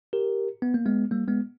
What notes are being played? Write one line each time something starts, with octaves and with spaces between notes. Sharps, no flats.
G4 A#4
B3
A#3
G#3 B3
G3 A#3
G#3 B3